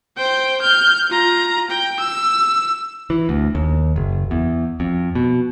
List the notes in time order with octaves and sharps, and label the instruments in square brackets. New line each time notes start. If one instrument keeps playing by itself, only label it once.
[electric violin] C5 G5
F6 G6
F4 A#5
G5
E6
[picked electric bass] E3
D2
D#2
F#1
E2
F2
B2